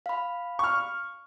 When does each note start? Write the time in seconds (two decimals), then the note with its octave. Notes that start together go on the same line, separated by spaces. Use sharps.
0.06 F5 B5
0.59 C#6 F6